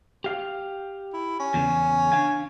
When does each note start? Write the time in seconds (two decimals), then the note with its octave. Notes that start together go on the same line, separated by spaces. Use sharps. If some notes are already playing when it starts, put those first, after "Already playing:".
0.24 G4 F5
1.13 E4
1.40 C#4
1.54 E2 C#3
2.12 D4 F5 G#5